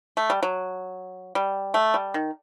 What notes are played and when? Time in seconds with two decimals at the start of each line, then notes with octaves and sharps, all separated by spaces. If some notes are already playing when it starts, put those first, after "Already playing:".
0.17 A3
0.30 G3
0.43 F#3
1.35 G3
1.74 A3
1.94 G3
2.14 D#3